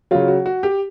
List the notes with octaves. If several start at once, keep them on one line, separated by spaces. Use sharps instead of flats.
C#3 F#3 F4
F#4
F#4
G4